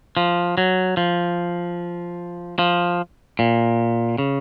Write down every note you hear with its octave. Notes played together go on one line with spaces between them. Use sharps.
F3
F#3
F3
F3
A#2
C#3